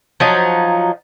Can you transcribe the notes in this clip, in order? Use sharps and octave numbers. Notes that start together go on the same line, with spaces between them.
F3 F#3 D#4